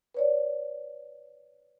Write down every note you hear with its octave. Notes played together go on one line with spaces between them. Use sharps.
B4 C#5 D5